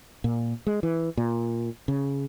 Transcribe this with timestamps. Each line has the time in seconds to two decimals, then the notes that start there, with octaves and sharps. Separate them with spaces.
0.24 A#2
0.67 G#3
0.83 E3
1.17 A#2
1.88 C#3